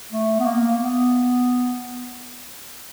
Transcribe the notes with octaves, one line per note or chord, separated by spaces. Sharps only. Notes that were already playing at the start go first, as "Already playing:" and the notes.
A3
B3
A#3
B3